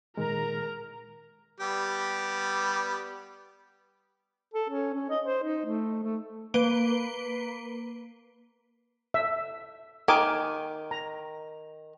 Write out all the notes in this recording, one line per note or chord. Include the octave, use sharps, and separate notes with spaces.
A#2 D#3 G#3 A#4 A#5
G3 B3 G4
A4
C#4
C#4
D#5
C5
D#4
A3
A3
A#3 B4 D7 G7
E5
D#3 A#4 G#5 D6
A#5